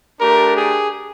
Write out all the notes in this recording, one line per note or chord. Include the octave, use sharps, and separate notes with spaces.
A3 D4 G4 A#4
G#4